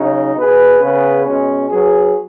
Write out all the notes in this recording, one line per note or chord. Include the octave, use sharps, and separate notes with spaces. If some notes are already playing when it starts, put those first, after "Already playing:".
Already playing: C#3 F#3 D#4
B2 B3 G#4 B4
C#3 B3 G#4 B4
B2 G#3 C#4
F#3 B3 G#4